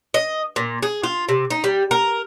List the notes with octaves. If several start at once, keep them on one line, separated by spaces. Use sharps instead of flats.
D#5
A#2
G#4
F4
C3
D#4
G3
A#4